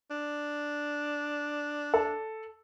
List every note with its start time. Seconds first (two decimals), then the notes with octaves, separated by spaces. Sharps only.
0.10 D4
1.94 A4